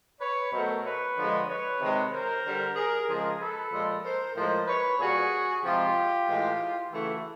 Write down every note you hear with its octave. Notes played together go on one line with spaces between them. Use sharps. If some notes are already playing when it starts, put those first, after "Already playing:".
B4 C#5
B2 F#3 A3 A#4 C5
B4 C#5
D3 F3 G#3
B4 C#5
C3 D#3 G#3
A#4 C5
D3 G3
G#4 A#4
C#3 F3 G#3 G#4 A#4
A4 B4
A#2 F3 G#3
A#4 C5
A2 F3 G#3 A#4 C5
B4 C#5
A#2 G3 F#4 G#4
C3 F3 G#3 F4 G4
A2 E3 G#3
C#3 E3 A3 E4 F#4